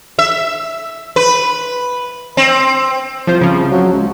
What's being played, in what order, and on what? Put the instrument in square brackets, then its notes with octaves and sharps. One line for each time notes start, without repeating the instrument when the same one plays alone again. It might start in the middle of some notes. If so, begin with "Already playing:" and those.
[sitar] E5
B4
C4
[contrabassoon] C2 [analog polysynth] F3 F4 C5
[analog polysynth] C#3 F3
[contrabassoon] F#3
C#2